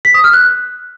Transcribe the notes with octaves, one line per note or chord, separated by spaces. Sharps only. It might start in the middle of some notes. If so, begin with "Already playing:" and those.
B6
D#6
F6
F#6